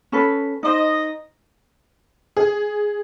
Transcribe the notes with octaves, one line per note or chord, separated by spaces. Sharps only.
C#4 A4 B4
D#4 C5 D#5
G#4